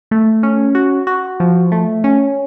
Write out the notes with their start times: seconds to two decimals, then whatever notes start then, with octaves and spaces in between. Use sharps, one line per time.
0.11 A3
0.43 C#4
0.75 F#4
1.07 F#4
1.40 F3
1.72 A3
2.04 C#4